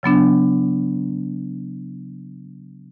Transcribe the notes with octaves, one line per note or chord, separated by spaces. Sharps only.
C#3 F#3 B3 D4